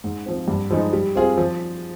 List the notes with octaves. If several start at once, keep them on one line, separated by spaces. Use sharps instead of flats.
G#2
F3 C4
G2
F3 G#3 D#4
G3
C4 F4 G#4
F3